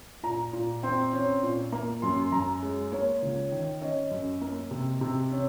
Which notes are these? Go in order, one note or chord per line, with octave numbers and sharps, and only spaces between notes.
A#2 A#5
A#2
C4
C#4
A#2
A#3
F#2 C6
F#2 A#5
G#3
A#3 C#5
C#2
D#3
C#4 D#5
F#2
A#3
C3
C3
C#4